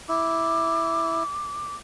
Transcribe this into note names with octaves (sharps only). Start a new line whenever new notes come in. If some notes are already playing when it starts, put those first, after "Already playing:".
E4 D6